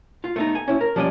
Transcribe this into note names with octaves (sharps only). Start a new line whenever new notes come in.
F4
A3 B3 D#4
G#5
C#4 E4
A#4
F3 G3 C#4 D5 D#5